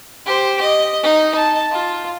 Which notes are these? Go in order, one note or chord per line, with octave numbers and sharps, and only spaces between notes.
G4 C5
D#5
D#4
A5
F4